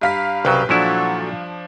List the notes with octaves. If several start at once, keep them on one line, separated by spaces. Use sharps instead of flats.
G2 F5 A#5 B5 B6
C2 C#3 F#3 B4 G5
A#2 F3 F#3 D4 E4 F#4 A4 F#5